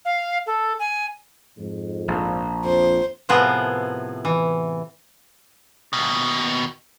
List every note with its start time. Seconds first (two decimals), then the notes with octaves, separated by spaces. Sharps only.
0.05 F5
0.46 A4
0.79 G#5
1.58 F2 G#2
2.08 A#1
2.64 F2 C5
3.29 A2 C3 F3 B3 G#4 A#4
4.25 E3
5.93 D#2 B2